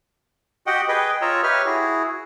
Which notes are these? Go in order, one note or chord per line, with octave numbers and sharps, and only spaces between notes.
F#4 G4 D#5 F#5 G5
G#4 B4 D#5 G5
F4 C#5 D#5 A#5 E6
G4 B4 C#5 E5 F6
E4 F#4 G#4